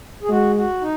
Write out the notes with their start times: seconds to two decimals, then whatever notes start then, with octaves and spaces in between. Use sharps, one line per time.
0.22 G#4
0.29 G#3 F#4
0.56 F#4
0.81 D#4